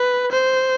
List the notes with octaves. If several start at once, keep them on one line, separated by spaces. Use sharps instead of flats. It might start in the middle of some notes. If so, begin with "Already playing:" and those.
Already playing: B4
C5